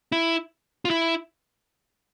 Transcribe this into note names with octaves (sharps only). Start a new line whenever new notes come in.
E4
F4
E4